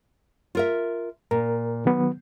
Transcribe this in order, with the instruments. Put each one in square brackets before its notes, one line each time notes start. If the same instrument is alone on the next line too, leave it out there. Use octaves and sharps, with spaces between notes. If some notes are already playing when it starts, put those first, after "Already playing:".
[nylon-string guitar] F4 A#4 E5
[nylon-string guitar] A#2 [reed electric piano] A#4
[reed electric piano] D#3 F#3 B3